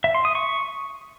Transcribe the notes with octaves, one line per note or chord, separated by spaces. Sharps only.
E5
C6
D#6
C#6